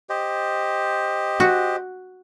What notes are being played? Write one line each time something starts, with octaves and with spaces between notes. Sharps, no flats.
G4 C5 D#5
F#4